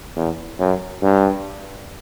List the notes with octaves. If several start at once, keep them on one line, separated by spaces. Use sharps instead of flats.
E2
F#2
G2